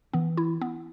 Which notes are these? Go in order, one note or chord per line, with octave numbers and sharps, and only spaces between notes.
E3 B3
E4
B3